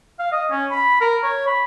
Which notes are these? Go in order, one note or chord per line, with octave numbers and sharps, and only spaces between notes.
F5
D#5
C#4
B5
A#4
C#5
B5